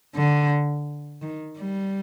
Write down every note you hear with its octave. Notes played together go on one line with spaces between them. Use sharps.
D3
D#3
G3